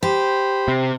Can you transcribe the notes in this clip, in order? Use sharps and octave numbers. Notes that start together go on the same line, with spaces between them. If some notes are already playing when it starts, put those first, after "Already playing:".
G4 C5 B5
C3